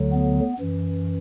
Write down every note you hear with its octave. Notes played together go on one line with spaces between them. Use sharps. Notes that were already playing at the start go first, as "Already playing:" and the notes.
Already playing: D2 D3 F#3
B3
F#2 E3